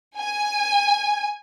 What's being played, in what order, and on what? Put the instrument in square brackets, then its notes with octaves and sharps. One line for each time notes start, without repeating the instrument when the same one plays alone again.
[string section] G#5